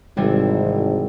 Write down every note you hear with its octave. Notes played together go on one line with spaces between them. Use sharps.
G#1 C3 E3 G3